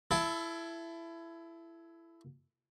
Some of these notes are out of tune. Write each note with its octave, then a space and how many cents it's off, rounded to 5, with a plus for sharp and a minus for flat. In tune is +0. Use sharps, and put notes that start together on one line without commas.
E4 +20 A4 -10